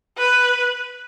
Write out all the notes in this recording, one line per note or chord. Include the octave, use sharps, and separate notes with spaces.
B4